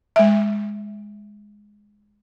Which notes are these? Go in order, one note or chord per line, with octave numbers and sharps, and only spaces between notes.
G#3 E5